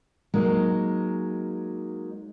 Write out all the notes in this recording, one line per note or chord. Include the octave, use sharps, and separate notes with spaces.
F#3 G#3 A#3 D#4